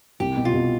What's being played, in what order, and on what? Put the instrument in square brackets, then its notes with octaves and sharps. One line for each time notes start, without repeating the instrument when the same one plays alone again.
[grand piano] C2 [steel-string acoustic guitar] G4
[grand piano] B2
[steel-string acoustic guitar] F4
[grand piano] B2